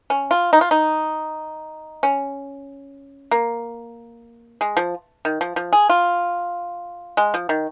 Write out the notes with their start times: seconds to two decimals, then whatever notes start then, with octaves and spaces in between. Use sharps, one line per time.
0.10 C#4
0.31 F4
0.53 D#4
0.61 F4
0.71 D#4
2.03 C#4
3.31 A#3
4.61 G#3
4.77 F3
5.25 D#3
5.41 F3
5.56 F3
5.73 G#4
5.89 F4
7.17 G#3
7.34 F3
7.49 D#3